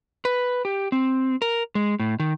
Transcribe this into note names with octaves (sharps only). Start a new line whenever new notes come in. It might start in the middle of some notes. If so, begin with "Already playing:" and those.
B4
G4
C4
A#4
G#3
A2
D#3